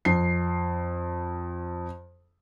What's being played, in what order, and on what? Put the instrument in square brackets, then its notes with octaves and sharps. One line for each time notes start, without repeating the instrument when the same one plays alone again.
[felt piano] F2 C7